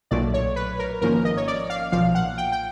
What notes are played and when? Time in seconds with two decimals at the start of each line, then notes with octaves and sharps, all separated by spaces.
0.11 B1 A#2 F#3 A3 D5
0.34 C#5
0.56 B4
0.79 A#4
1.01 G#1 G#2 F3 A#3 C#4 A#4
1.25 D#5
1.37 C#5
1.48 D5
1.70 F5
1.92 B1 A#2 F3 F5
2.15 F#5
2.38 G5
2.52 G5